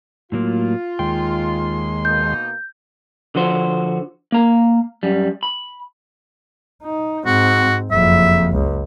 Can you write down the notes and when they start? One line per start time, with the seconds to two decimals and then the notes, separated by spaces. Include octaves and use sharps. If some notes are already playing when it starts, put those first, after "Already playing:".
0.32 A2 F#3 A#3 F4
0.99 D#2 G#3 G5 C6
2.05 B2 A#3 D#4 G6
3.35 D3 F3 F#4 C5
4.32 A#3 A#5
5.03 F#2 G3
5.43 B5
6.83 D#4
7.26 G#2 C4 F#4
7.91 F#1 F2 E5
8.54 C#2